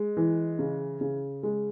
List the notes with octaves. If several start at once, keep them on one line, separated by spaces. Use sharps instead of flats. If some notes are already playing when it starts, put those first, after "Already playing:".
Already playing: G#3
E3
C#3
C#3
G#3